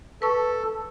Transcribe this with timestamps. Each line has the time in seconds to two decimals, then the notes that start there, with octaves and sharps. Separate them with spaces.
0.22 A4 B4 C#6